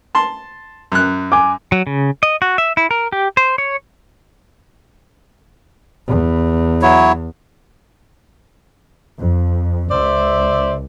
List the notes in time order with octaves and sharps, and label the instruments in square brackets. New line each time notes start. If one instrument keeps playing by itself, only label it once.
[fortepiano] A5 C6
F#2 F#6
[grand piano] G#5 D6
[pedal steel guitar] F#3
C#3
D#5
F#4
E5
E4
A#4
G4
C5
C#5
[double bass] E2
[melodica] F#3 E4 C#5
[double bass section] F2
[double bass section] C#2 [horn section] C5 D5 E5